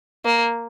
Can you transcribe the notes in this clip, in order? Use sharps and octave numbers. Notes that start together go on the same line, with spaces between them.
A#3